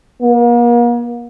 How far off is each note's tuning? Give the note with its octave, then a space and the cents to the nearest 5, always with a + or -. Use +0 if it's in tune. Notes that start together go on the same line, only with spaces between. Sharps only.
A#3 +40